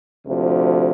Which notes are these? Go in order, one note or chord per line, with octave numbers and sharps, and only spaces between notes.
D2 C3 F3